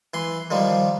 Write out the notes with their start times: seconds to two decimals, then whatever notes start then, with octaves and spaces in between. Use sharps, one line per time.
0.14 E3 C6
0.51 D#3 F3 G3